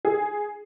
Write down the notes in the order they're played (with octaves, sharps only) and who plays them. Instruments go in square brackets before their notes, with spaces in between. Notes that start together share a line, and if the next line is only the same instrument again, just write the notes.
[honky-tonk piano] G#4